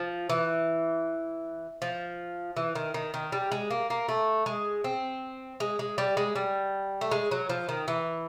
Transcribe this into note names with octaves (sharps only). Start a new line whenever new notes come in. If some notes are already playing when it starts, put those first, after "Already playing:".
Already playing: F3
E3
F3
E3
D#3
D#3
D#3
G3
G#3
A#3
A#3
A3
G#3
C4
G#3
G#3
G3
G#3
G3
A3
G#3
F#3
F3
D#3
E3